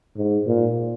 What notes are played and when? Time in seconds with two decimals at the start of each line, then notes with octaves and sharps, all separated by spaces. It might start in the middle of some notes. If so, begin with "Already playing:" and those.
0.17 G#2
0.46 A#2